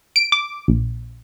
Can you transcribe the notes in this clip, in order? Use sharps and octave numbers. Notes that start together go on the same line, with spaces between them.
D7
D6
A#1